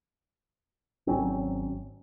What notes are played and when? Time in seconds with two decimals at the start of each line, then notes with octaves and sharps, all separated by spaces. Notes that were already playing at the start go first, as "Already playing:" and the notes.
1.07 G#1 F#3 C4 C#4